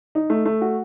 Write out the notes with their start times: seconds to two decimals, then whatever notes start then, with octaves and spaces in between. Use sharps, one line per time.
0.15 D#4
0.30 A3
0.46 A3
0.61 F#4